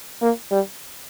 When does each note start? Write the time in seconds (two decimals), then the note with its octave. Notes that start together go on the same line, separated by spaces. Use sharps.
0.22 A#3
0.51 G3